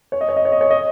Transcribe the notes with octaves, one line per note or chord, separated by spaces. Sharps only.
C#5
D#5
C#5
D#5
C#5
D#5
C#5
D#5